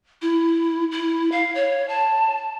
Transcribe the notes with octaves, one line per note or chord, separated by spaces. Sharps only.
E4
E4
F5
C#5
A5